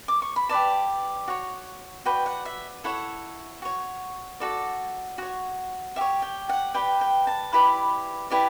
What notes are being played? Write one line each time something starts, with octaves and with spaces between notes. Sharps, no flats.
D6
C#6
B5
G4 B4 D5 A5
F#4 C#5
F#4 B4 D5 G5
F#5
E5
E4 A4 C#5 F#5
F#4 C#5
F#4 A4 D5
F#4 C#5
G4 C#5 E5
G5
F#5
G4 B4 D5 G5
G5
A5
E4 G4 B4 D5 B5
E4 G4 B4 D5